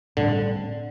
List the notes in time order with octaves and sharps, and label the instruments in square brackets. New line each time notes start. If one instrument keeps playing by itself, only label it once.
[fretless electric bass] A2 G3 C4 [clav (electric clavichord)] D3